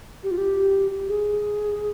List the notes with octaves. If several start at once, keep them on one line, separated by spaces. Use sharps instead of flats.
G4
F4
G4
G#4